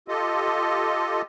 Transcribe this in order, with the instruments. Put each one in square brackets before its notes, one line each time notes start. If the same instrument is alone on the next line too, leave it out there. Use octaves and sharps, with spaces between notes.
[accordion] F4 G4 A4 D#5